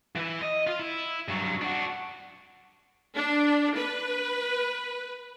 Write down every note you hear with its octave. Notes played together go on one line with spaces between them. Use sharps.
E3 E4
D#5
F4
E4
G2 F#3
D4 F#4
D4
B4